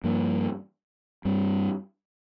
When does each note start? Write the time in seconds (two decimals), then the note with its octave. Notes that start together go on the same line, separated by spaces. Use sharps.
0.04 G2 F3 A#3
1.25 G2 G3 C4